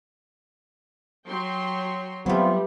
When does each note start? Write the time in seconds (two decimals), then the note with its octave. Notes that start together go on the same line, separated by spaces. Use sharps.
1.26 F#3 G5 C6
2.26 E3 F#3 G3 A3 B3 C4 F4